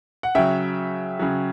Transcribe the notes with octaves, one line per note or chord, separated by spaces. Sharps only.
F#5
C#3 F#3 E5 G5
C#3 F#3